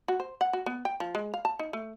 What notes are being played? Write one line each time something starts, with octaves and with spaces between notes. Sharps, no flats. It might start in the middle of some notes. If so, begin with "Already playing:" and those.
F#4
C5
F#5
F#4
B3
G5
F3
G#3
F5
A5
D#4
A3